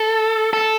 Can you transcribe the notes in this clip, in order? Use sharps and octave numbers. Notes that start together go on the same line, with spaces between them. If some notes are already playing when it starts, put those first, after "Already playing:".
Already playing: A4
A4